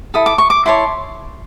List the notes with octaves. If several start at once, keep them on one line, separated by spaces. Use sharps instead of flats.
E4 A4 D#6
D6
C#6
D6
E4 A4 C#5 C6